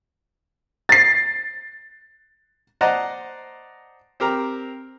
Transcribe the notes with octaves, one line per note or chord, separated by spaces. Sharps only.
A6 C7
C5 D5 D#5 F#5 A5 A#5
C4 G4 A#4 A#5